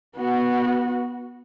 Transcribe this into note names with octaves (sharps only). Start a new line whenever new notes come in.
B3 F#4